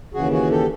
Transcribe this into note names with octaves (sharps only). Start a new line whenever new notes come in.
D#2 C#3 E3 F#4 G#4
F#4 G#4
G4 A4